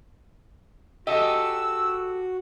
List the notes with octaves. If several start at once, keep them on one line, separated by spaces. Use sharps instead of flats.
F#4 G4 A4 D#5 E6